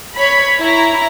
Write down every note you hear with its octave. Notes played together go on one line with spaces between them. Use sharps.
C#5 B5
E4 A#5